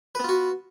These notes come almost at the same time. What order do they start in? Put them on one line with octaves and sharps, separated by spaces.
B4 B3 F4 F#4